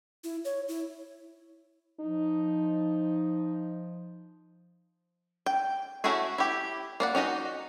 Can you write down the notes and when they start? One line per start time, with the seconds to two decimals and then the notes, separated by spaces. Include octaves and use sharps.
0.24 E4
0.45 C#5
0.68 E4
2.00 F3 D#4
5.46 G5
6.04 A3 C#4 E4 F#4 G#4
6.38 E4 G4
7.00 A#3 D5 F#5
7.15 C#4 D#4 F#4 D#5